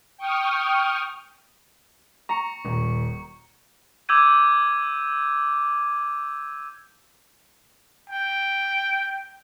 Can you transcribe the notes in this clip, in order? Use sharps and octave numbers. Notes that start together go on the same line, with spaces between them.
G5 C#6 D#6 F6
A#5 C#6 C#7
D#1
D6 E6 G6 G#6 D#7
G5